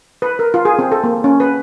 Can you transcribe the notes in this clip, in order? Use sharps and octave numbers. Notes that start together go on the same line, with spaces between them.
B4
A#4
F4
G#4
C4
A4
A#3
C#4
B4